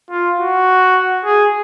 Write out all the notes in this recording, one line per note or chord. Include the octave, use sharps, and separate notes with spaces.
F4
F#4
G#4